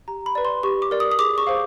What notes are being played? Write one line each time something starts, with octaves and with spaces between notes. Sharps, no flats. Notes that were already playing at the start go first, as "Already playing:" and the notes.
G4 A#5
B5
B4 D5
C6
G4 C#6
D6
A#4 D5
D#6
D#6
G#4 D6
C#6
C5 F5